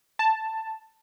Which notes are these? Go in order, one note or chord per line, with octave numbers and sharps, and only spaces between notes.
A5